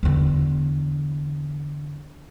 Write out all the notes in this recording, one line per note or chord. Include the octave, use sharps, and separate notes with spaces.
E2 D3